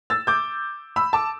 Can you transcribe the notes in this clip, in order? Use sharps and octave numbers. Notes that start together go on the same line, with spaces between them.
E6 A6
D6 G6
B5 E6
A5 D6